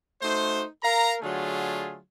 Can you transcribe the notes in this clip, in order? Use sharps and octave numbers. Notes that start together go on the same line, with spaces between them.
A3 D#4 F#4 C5
A#4 F5 A#5
D3 F#3 A3 F4 G#4